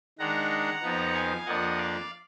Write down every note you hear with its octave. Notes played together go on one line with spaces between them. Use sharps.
D#3 G#3 D4 F#5 A#5
F2 F3 B3 D#4
F5 G#5
F2 F3 A#3 D4 D#5 F#5
D5 F5